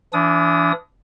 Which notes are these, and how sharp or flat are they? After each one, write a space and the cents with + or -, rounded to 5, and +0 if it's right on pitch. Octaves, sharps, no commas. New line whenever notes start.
E3 +30 D4 -25 D#6 +15